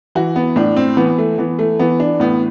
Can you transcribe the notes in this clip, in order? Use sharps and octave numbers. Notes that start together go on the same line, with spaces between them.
E3 F#4
B3
A2 D4
C4
E3 B3
A3
E3 B3
A3
E3 B3
D4
A2 B3